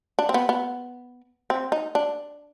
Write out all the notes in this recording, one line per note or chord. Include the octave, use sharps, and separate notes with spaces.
D4
C4
B3
B3
C4
D#4
D4